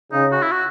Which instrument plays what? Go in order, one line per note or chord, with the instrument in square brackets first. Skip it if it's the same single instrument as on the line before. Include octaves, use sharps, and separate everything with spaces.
[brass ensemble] C#3 [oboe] D#4
[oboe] F#4
E4
F#4